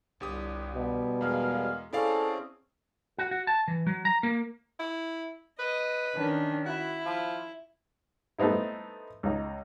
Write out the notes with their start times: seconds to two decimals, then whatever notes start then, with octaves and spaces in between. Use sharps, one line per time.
0.20 G1 C2 G4 D#6
0.75 B2 G3
1.21 E2 G#3 G#4 A#4 F5
1.93 C4 C#4 E4 G#4 A4 D5 F5
3.18 F#4
3.31 F#4
3.47 A5
3.68 E3
3.87 F#3
4.05 A#5
4.23 A#3
4.80 E4
5.59 B4 D#5
6.17 D#3 C#4 D4
6.66 E4 F#4
7.06 F3
8.38 A3 B3 C4 D#4 E4
9.23 C#2 D#4